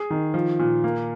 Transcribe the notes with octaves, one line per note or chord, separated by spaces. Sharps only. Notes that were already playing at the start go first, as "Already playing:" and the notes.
Already playing: G#4
D#3
F3
A#2
A#3